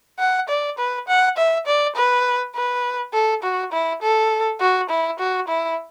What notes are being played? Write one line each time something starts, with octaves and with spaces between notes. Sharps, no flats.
F#5
D5
B4
F#5
E5
D5
B4
B4
A4
F#4
E4
A4
F#4
E4
F#4
E4